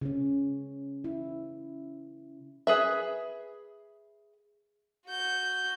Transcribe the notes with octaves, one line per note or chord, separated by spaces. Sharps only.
C#3 C#4
E4
G#4 B4 E5
F#4 G6